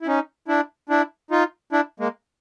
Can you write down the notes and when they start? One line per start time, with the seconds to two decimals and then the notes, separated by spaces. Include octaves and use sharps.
0.02 E4
0.07 C#4 D#4
0.48 D4 E4
0.89 D4 E4
1.31 D#4 F4
1.72 D4 E4
2.00 G#3 A#3